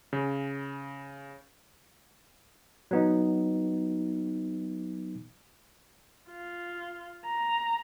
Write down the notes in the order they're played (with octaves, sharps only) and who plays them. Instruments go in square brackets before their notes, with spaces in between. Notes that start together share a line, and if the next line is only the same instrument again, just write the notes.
[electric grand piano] C#3
[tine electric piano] F#3 B3 D#4
[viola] F4
A#5